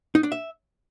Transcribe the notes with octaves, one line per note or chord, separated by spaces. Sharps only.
D#4
D4
E5